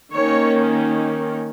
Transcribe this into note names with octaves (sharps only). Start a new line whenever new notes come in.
D#3 A#3 C#4 C#5